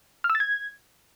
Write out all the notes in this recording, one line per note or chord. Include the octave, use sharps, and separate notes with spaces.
F6
E6
A6
G#6